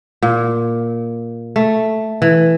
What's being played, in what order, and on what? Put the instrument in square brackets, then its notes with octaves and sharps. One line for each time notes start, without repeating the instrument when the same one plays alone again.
[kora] A#2
A3
E3